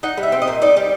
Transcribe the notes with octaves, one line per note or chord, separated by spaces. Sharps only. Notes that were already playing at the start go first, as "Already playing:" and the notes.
D#4 F#5
G3
E5
C4
D#5
A#2
D#4 D5
G3